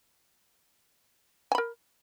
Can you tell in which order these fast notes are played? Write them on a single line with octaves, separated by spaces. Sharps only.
G#5 B5 A#4